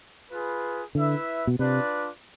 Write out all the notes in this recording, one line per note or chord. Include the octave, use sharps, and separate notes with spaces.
F4 G#4 B4
D3 E4 B4 E5
B2
C3 D4 F4 B4 D5